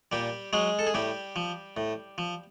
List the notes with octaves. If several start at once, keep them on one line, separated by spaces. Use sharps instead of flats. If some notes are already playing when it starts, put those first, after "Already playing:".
A#2 G3 G4
F#3 G#3 G#4
A4
G#4
A2 G3 G4
F3
A2
F3